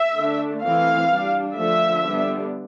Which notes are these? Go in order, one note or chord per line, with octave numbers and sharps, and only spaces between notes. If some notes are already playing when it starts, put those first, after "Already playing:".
Already playing: E5
D3 A3 D4
E3 A3 C4 F5
G3 D4
D3 F3 A3 E5
D3 G3 B3 D4